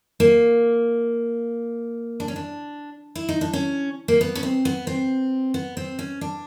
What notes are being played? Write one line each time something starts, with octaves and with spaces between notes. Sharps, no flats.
A#3
D4
C#4
D4
E4
D#4
D4
C#4
A#3
B3
C#4
C4
B3
C4
B3
C4
C#4
D4